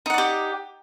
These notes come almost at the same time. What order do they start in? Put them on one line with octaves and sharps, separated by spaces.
D#4 F#5 D5 G4